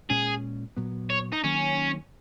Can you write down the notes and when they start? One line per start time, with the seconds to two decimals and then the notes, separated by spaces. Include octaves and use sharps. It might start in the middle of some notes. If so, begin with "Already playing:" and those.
0.10 A#2 G#3 C#4 G#4
0.77 A#2 F#3 B3
1.10 C#5
1.32 D#4
1.44 D#3 F#3 A#3 C#4